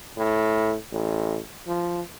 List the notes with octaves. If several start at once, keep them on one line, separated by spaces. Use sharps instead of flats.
A2
A1
F3